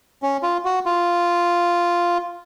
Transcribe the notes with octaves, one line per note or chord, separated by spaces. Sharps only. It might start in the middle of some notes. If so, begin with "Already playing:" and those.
C#4
F4
F#4
F4